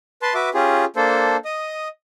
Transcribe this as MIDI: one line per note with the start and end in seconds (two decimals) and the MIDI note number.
0.22 0.34 71
0.22 0.34 81
0.22 0.34 84
0.34 0.49 66
0.34 0.49 71
0.34 0.49 76
0.34 0.49 86
0.54 0.85 61
0.54 0.85 65
0.54 0.85 67
0.54 0.85 68
0.96 1.37 58
0.96 1.37 62
0.96 1.37 69
0.96 1.37 72
1.45 1.88 75
1.45 1.88 87